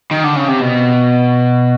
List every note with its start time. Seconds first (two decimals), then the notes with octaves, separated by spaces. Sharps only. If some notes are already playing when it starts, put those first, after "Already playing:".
0.11 D#3
0.23 D3
0.35 C#3
0.48 C3
0.60 B2